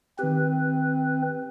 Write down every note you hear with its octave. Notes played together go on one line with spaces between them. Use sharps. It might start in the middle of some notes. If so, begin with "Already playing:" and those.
D#3 C4 G4 B4